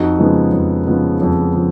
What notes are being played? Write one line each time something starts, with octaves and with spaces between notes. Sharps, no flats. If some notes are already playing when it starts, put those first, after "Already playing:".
Already playing: F2 D#4 F#4
C#3 F3 G#3 B3
F2
C#3 F3 G#3 B3
F2
C#3 F3